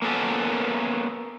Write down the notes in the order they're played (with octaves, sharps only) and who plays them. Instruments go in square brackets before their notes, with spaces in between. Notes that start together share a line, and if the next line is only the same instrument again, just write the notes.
[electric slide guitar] A#3 B3 C#4 A4 A#4